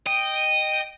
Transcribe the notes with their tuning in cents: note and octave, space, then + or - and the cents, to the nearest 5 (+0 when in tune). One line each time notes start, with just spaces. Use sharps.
D#5 -10 G5 +0